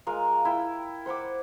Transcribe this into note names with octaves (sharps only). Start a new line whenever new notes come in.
G#3 F4 A#4 F5
E4 G5
C5 F#5 B5 D6